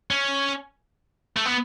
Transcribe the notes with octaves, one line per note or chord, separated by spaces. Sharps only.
C#4
A3
B3